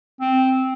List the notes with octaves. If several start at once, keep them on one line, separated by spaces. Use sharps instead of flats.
C4